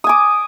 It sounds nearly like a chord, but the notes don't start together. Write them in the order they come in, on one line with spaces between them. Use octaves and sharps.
D#6 G#5 D6